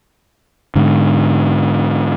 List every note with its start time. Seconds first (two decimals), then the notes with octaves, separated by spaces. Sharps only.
0.76 G#2 D3